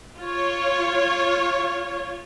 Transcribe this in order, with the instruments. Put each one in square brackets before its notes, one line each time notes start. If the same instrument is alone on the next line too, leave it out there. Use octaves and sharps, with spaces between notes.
[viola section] F4 C#5